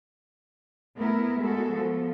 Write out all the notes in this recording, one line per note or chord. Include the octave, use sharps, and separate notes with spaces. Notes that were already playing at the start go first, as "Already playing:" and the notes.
A3 B3 E4 A#4
G#3 B3 F#4 A4
F3 B3